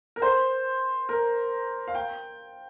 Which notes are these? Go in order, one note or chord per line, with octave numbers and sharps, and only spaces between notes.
A#4
C5
A#4
F5
G5